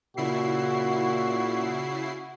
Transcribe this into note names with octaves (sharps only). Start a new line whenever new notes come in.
A#2 C#3 E4 F#4 C7